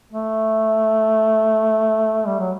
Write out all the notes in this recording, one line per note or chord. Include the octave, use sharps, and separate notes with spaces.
A3
G3
F#3